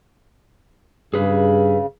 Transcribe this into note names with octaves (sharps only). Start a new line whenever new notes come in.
G2 C#3 G#4 B4